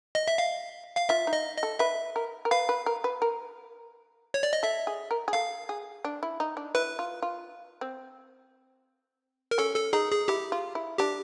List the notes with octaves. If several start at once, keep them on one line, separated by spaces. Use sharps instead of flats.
D#5
E5
F5
F5
F4 E5
D#4
D#5
D#5
A4
B4 E5
A#4
A#4
B4 F5
B4
A#4
B4
A#4
C#5
D5
D#5
A4 E5
G#4
A#4
G#4
A4 F5
G#4
D4
E4
D#4
D4
E4 B4
F4
F4
C4
A#4
C#4 A4
A4
D#4 G#4
G#4
E4 G4
F4
E4
D4 G4